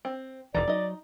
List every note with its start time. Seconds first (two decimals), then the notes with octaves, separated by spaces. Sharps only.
0.05 C4
0.55 E1 E2 E3 D#4 D5 A#5
0.68 F#3 D#4 D#5